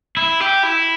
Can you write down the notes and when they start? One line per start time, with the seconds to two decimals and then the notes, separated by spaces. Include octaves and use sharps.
0.17 E4
0.40 G4
0.63 E4